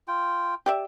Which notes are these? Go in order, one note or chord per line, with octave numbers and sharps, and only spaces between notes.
F4 G5
G4 D5 E5